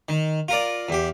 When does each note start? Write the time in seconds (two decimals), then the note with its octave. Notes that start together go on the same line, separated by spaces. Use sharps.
0.09 D#3
0.48 F4 A#4 D5
0.89 E2 G4